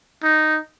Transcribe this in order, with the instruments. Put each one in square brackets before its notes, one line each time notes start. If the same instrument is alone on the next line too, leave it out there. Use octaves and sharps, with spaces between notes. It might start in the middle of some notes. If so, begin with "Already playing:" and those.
[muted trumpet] D#4